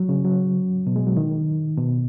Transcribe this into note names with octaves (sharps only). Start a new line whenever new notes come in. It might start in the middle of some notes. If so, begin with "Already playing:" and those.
Already playing: F#3
C#3
F#3
B2
G#3
F#3
D#3
B2